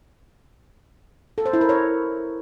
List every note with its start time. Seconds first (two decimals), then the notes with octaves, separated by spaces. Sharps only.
1.38 A4
1.46 C5
1.53 E4
1.61 A#4
1.69 C#5